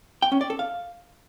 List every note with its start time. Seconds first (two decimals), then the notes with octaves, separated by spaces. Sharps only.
0.22 G5
0.32 C#4
0.41 D5
0.50 A4
0.59 F5